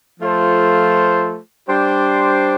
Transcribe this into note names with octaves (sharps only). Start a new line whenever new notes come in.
F3 A3 F4 A4 C5
G3 D4 G4 C5